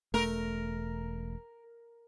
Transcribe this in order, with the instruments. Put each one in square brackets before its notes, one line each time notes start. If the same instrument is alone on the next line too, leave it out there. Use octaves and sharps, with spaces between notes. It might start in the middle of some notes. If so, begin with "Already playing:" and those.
[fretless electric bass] E1 A3 [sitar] A#4